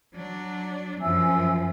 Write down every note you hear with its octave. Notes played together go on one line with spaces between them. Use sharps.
F#3 D4
F#2 F3 E5 G#5 E6